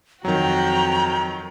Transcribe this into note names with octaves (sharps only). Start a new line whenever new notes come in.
F2 D#3 F#3 F#4 G5 A#5